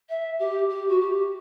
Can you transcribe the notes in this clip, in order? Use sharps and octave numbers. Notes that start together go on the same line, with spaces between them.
E5
G4
G4
F#4
G4